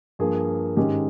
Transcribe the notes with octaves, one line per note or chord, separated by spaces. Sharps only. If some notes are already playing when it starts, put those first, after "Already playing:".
G2 F3 A#3 F4 G#4
G#2 D#3 G#3 C#4 G4